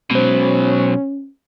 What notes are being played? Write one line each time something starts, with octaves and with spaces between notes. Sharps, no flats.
B2 F#3 G#3 C#4 C5